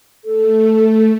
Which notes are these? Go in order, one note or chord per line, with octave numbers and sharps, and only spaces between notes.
A3 A4